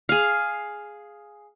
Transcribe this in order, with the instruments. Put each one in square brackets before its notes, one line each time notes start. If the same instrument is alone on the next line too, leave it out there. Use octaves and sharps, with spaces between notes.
[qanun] G#4 F5